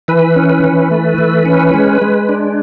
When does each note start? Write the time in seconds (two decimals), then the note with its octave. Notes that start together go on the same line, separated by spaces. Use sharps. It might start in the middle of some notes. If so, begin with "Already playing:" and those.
0.08 E3 B4
0.36 C#4
0.49 B4
0.64 E3
0.91 A3
1.18 E3
1.46 C#4
1.74 G#3
2.02 G#3
2.29 D4